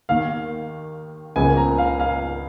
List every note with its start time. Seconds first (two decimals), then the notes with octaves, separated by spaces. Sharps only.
0.09 D#2 D#3 A#3 F5
1.36 C#2 C#3 F3 A#3 G#5
1.57 A#5
1.78 F5
2.00 F5